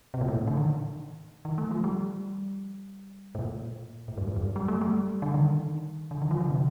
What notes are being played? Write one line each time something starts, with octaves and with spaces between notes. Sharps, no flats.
C3
A#2
A2
D3
D#3
D#3
A3
F3
G3
A2
A#2
A2
G2
F2
G2
G3
A3
G3
D3
D#3
D3
D#3
F3
D3
C3